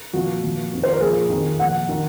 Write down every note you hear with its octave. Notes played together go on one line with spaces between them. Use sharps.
A#2 F3 F#4
A#2 F3
F2 D#3
C5
A#4
A#2 F3 G#4
F2 D#3
A#2 F3 F#5
D#3